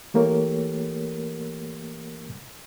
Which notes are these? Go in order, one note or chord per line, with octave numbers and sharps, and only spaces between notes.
E3 A3 A#3 G4 A#4 C#5